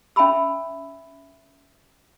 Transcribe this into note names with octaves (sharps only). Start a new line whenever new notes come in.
C#4 E5 G5 A5 B5 E6